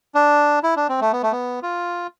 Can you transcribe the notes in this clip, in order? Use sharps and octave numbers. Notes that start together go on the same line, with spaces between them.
D4
E4
D4
C4
A3
B3
A3
B3
F4